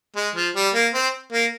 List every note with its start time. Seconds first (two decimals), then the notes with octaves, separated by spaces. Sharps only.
0.16 G#3
0.35 F3
0.55 G3
0.74 A#3
0.94 C4
1.33 A#3